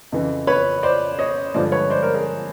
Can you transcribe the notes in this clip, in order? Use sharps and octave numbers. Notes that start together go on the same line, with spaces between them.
F2 C#3 E3
B4 C#5
C5 D5
C#5 D#5
G2 D3 F3 G#3 C5 D5
B4 C#5
C5 D5
A#4 C5
G#4 A#4